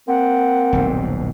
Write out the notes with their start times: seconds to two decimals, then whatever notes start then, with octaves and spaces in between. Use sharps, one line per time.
0.08 A#3 C4 F#5
0.73 D#1 B1 G#2